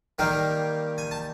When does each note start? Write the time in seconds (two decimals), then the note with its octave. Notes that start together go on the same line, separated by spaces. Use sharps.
0.19 D#3 G3 A#3 F5 G5
0.98 G#5
1.11 A5